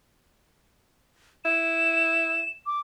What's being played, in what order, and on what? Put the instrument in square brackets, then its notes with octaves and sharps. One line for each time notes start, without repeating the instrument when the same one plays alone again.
[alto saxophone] E4 [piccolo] E7
[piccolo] D6